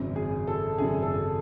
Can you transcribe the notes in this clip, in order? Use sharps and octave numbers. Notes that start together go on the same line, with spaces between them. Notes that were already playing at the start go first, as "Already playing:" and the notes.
Already playing: G#1 F#2 C#3
G#4
A4
G#1 F#2 C#3 G#4
A4